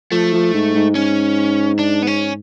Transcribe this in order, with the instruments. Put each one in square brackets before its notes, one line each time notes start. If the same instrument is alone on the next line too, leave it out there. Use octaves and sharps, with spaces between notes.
[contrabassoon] F3 [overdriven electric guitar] A3
[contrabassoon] F3
G#2
G#2
[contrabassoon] G#2 [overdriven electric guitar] C#4
[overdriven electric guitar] D4
B3
C#4